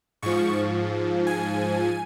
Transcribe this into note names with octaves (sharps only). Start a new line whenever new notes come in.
G#2 F3 C#6
G#5